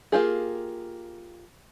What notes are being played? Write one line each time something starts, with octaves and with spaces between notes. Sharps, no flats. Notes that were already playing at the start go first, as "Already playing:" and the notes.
A#3 F4 G4 G#4